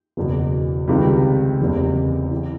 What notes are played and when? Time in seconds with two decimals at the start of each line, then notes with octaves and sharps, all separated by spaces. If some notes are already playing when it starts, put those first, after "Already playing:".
0.17 F#1 E2 B2
0.88 C#2 C3 D#3 G3
1.60 F#1 E2 C3 E3
2.31 E3